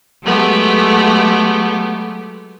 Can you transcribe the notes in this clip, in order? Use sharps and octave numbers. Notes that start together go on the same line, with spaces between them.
F#3 G#3 A3 B3 G4